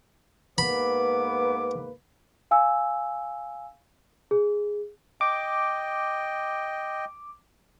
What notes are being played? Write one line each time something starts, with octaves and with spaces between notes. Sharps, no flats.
G#2 A#3 B3 B4 B5 D6
F5 G#5 E6
G#4
D#5 G5 D6